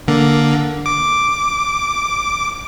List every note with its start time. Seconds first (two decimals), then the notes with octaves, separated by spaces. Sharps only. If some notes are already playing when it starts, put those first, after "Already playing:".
0.08 D3 A#3
0.86 D6